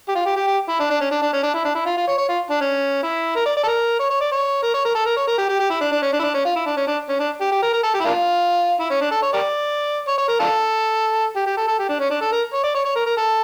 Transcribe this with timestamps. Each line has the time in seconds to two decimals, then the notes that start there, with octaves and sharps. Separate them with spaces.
0.09 G4
0.15 F4
0.26 G4
0.37 G4
0.47 G4
0.69 E4
0.80 D4
0.90 D4
1.01 C#4
1.11 D4
1.22 D4
1.33 C#4
1.43 D4
1.54 E4
1.65 D4
1.75 E4
1.86 F4
1.97 F4
2.07 C#5
2.18 C#5
2.29 F4
2.50 D4
2.61 C#4
3.03 E4
3.36 A#4
3.46 D5
3.57 D5
3.64 A4
3.68 A#4
4.00 C#5
4.10 C#5
4.21 D5
4.32 C#5
4.63 A#4
4.74 C#5
4.85 A#4
4.95 A4
5.06 A#4
5.17 C#5
5.28 A#4
5.38 G4
5.49 G4
5.60 G4
5.70 E4
5.81 D4
5.92 D4
6.02 C#4
6.13 D4
6.20 E4
6.24 D4
6.34 C#4
6.45 F4
6.56 E4
6.66 D4
6.77 C#4
6.88 D4
7.09 C#4
7.20 D4
7.41 G4
7.52 G4
7.62 A#4
7.73 A#4
7.83 A4
7.94 G4
8.00 E4
8.05 A#3 D4 F4
8.80 E4
8.91 C#4
9.01 D4
9.12 A4
9.23 C#5
9.33 G4 A#4 D5
10.08 C#5
10.18 C#5
10.29 A#4
10.40 D4 F4 A4
11.36 G4
11.46 G4
11.57 A4
11.68 A4
11.79 G4
11.89 D4
12.00 C#4
12.11 D4
12.21 A4
12.32 A#4
12.53 C#5
12.64 D5
12.74 C#5
12.85 C#5
12.96 A#4
13.06 A#4
13.17 A4